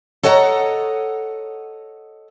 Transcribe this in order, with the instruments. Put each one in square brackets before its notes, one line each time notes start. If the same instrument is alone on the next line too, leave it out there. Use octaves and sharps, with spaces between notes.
[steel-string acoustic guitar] A4 C#5 D#5 F#5 A5 A#5